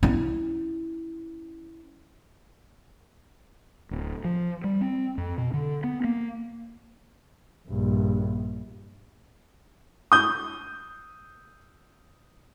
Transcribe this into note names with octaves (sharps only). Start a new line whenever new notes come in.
C#4 E4
D1
F3
G3
C4
F2
B2
D3
B3
A#3
A#1 G2
D#6 G6